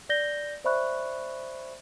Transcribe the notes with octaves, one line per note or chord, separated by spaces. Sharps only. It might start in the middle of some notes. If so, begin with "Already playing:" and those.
D5 G6 A#6 G7
C5 D5 E5 B5 C#6 F#6